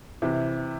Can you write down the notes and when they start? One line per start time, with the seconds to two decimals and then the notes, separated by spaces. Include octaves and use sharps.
0.22 C3 E3